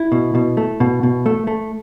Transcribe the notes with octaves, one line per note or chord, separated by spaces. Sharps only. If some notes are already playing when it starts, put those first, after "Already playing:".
Already playing: E4
B2
B2
A3
B2
B2
A3
A3